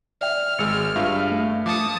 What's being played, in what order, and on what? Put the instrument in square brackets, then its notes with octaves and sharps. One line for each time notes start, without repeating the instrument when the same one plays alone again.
[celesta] D5 E5 G5 [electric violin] F6
[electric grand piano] G#1 G#3 [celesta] E6 C#7
[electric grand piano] G2 [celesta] F4 E5 F5
[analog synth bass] A3
[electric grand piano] F3 [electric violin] A5 D#6 [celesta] D6 C#7